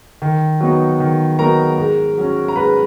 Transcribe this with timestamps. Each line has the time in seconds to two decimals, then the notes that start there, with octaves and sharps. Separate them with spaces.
0.22 D#3
0.60 F#3 B3 D#4
1.00 D#3
1.39 F#3 B3 D#4 A#4 A#5
1.78 G#2
2.18 F#3 C#4
2.48 A#5
2.56 G#2 B4 B5